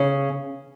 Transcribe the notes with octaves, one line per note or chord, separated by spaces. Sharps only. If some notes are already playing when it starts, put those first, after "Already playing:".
Already playing: C#3